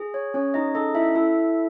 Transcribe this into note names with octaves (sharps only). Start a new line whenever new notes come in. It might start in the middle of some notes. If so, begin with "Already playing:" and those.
Already playing: G#4
C#5
C#4 C#5
D#4 D#5
D#4 A4 D#5
E4 E5
E4 A4 E5